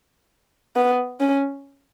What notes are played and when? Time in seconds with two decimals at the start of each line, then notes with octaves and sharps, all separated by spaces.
0.76 B3
1.20 C#4